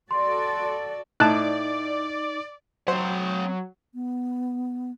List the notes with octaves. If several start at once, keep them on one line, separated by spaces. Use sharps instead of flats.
F#4 A4 D5 C6
A2 D#4 D5 A5 F#6
F#3 C4 C5 F#5
B3